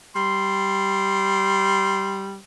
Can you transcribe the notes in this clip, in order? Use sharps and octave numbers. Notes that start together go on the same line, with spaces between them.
G3 C6